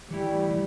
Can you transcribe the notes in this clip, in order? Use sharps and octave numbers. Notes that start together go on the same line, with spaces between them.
E3 G3 A3 E4 G4
E3